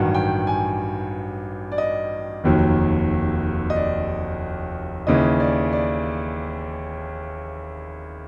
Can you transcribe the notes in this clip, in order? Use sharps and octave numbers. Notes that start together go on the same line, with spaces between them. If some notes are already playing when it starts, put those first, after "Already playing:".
Already playing: A1 G2 D#3 F#3 F#5
G5
G#5
D5
D#5
F1 D#2 D#3 F#3
D#5
D5
D#2 C#3 E3 D#5
D5
D5